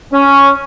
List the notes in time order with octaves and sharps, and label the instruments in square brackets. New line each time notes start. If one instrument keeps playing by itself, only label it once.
[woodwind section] C#4